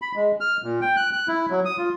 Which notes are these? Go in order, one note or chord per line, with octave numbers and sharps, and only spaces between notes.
B5
G#3
F6
A#2
G5
F#6
F#6
E4
F#3
D#6
F4